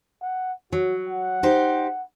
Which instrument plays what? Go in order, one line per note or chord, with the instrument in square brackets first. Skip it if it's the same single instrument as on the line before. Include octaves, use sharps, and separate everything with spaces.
[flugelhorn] F#5
[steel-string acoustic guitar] F#3 [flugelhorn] F#4
[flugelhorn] F#5
[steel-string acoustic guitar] D#4 G4 C5